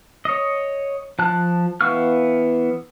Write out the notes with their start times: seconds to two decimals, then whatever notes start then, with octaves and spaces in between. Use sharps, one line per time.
0.25 C#5 D#5
1.19 F3 A5 F#6
1.81 E3 B3 F5 C#6 F6